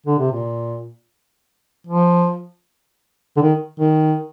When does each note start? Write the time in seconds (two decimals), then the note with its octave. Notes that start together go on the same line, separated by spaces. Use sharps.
0.06 D3
0.19 C3
0.32 A#2
1.87 F3
3.37 D3
3.41 D#3
3.80 D#3